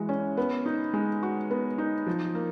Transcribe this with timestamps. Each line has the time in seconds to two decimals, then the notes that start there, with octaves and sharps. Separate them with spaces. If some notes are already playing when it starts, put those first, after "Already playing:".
Already playing: E3 G#3 F#4
0.09 C#4
0.37 B3
0.66 D#4
0.94 G#3
1.23 F#4
1.51 B3
1.78 D#4
2.07 F3
2.35 A#3